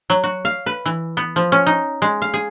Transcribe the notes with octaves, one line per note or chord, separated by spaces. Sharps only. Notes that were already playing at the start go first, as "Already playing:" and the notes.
F#3
F#4
F5
B4
E3
B3
F3
C#4
D#4
G#3
F5
G#4